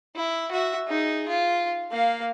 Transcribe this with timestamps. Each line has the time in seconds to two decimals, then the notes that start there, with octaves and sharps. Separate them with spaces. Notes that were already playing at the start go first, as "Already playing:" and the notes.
0.15 E4
0.51 F#4 E5
0.88 D#4 G#4
1.29 F4
1.91 A#3 F5